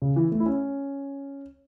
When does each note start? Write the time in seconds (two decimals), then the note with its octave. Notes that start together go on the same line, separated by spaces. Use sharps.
0.02 C#3
0.16 E3
0.32 A3
0.40 E4
0.46 C#4